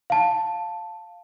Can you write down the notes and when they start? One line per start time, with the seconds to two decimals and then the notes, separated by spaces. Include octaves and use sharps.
0.10 F5 A5